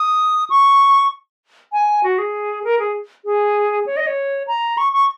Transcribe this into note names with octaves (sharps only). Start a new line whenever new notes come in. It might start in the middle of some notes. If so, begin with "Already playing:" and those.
Already playing: D#6
C#6
G#5
F#4
G#4
A#4
G#4
G#4
C#5
D#5
C#5
A#5
C#6
C#6